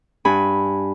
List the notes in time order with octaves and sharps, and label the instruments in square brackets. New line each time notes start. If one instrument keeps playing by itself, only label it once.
[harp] G2 G#5 B5